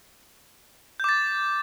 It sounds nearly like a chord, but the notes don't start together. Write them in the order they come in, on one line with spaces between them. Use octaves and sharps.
G6 D6 A6